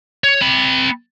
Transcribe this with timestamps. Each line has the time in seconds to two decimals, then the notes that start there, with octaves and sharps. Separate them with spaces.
0.24 C#5
0.41 C4 B5